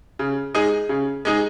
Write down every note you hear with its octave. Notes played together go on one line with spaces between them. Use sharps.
C#3
G#3 D#4 G#4
C#3
G#3 D#4 G#4